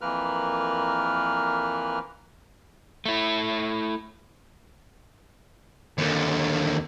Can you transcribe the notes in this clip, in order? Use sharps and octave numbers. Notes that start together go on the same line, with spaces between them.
F2 E3 A#3 A#4 B4 F6
A3 E4
D#2 D3